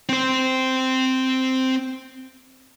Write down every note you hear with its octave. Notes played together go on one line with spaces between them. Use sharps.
C4 C5